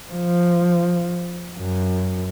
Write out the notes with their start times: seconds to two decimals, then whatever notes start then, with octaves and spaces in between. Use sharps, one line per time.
0.12 F3
1.58 F#2